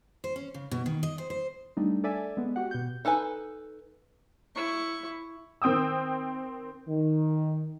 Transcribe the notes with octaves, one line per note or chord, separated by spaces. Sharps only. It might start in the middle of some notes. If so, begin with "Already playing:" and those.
C5
C#4
C#3
B2
D#3
D#5
C5
C5
G3 A3 D4 D#4
A4 D5 E5 G#5
G#3 B3
F#4 G4 F#5
B2 G6
D#4 A4 B4 G#5
E4 C#6
D#3 C4 G5 D#6 E6
D#3